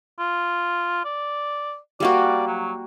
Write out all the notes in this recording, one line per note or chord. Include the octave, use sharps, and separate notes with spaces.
F4
D5
G3 A#3 F#4 D5
F#3